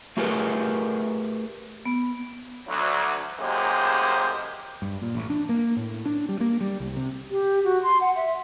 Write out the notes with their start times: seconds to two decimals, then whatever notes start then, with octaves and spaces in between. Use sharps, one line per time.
0.17 A3 F4 G4 G#4 A#4 B4
1.86 B3
2.68 D2 F#3
3.40 A1 F#2 G#3 A#3 G4 C5
4.82 G2
5.02 A#2
5.15 A1
5.30 D4
5.49 A#3
5.77 A2
6.06 D4
6.29 G3
6.41 A#3
6.61 G3
6.80 C2
6.96 C3
7.31 G4
7.64 F#4
7.83 C6
8.01 F#5
8.16 E5